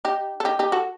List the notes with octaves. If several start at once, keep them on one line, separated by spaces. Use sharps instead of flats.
D#4 G4
A4
D#4 G4
D#4 G4
F#4 A4